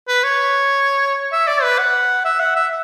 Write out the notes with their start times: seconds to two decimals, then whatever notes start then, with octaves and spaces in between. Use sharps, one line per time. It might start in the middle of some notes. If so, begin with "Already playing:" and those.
0.08 B4
0.24 C#5
1.32 E5
1.47 D5
1.63 B4
1.78 F#5
2.25 E5
2.40 F#5
2.56 E5